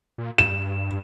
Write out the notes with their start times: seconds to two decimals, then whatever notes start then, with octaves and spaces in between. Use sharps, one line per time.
0.18 A#2
0.38 G2 E7